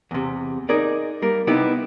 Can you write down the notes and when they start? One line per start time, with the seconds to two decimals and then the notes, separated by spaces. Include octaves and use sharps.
0.11 E2 C3
0.69 D#4 G#4 A#4 D5
1.22 G3 A#3 A#4
1.47 C3 B3 D#4 E4 G4